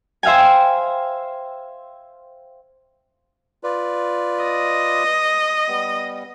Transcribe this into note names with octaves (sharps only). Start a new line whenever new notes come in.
C5 E5 F5 G5 G#5
F4 B4 D5
D#5
G3 B3